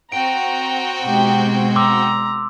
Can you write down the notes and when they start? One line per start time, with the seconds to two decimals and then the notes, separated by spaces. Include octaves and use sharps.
0.12 C4 F#4 G5 A#5 D7
1.04 B2 G#3 D#4 G4
1.76 A#5 C6 D6 E6